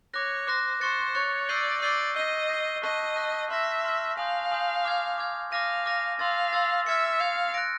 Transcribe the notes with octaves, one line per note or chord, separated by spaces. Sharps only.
C#5 D6 F#6 A#6
C5 D6 F#6 A#6
C5 C#6 F#6 A6 C#7
C#5 C#6 F#6 A6 C#7
D5 E6 G6 C7 D#7 G7
D5 E6 G6 C7 D#7 G7
D#5 G6 C7 D#7 G7
G6 C7 D#7 G7
D#5 A5 C#6 F#6 B6
A5 C#6 F#6 B6
E5 C6 F6 A#6
C6 F6 A#6
F5 G#5 C6 D#6 G6
G#5 C6 D#6 G6
D6 F6 G#6
D6 F6 G#6
F5 D6 F6 A#6 D#7
D6 F6 A#6 D#7
F5 C6 E6 A6
C6 E6 A6
E5 F6 G#6 C#7
F5 F6 G#6 C#7
F#6 A#6 D7